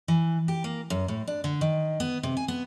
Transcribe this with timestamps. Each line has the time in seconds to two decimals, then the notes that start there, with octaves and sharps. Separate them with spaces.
0.08 E3
0.48 G4
0.64 A#3
0.90 F#2
1.08 A2
1.28 D4
1.44 D3
1.61 D#3
2.00 B3
2.23 C3
2.37 G#5
2.48 B3